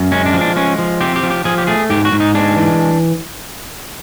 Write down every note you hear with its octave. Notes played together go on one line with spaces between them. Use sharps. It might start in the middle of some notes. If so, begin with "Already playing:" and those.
Already playing: F#2
G#3 C#4
D4
F3
D4
G#3 C#4
F3
C4 G4
G4
F3
G4
F3 G#4
G4
A3 G#4
G#2 G4
F#4
G#2
D#4
G#3 D4
E3